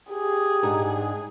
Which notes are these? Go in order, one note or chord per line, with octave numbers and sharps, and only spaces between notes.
G4 G#4
G#2 D4 D#4